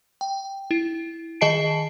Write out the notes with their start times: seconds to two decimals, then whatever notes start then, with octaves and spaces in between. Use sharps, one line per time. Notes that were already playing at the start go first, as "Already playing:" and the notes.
0.21 G5
0.71 E4
1.41 D#3 G#4 D#5 A5 C7 D7